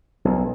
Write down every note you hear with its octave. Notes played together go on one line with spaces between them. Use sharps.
B1